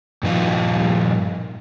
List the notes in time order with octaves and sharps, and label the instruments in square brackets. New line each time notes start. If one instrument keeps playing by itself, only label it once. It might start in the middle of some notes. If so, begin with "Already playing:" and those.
[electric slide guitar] G2 A#2 F3 D#4 F4